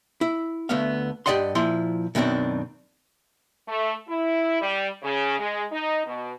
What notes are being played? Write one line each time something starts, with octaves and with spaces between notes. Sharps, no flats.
E4
D2 A3 B3 F5
G2 G4 D5 D#5 F#5 C6
A#2 F3 E4 C6
F#2 B2 D#3 C4 D4
A3
E4
G3
C#3
G#3
D#4
B2